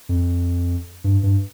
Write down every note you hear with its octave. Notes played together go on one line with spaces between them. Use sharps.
F2
G2
G2